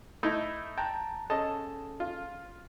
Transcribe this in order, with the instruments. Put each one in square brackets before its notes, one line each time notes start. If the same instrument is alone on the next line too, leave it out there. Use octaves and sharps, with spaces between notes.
[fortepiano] A3 D#4 E4
[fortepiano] G5 [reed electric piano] A5 A#5 F#6
[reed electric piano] C#4 G#4 A4 [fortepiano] D#5 A5
[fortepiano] F4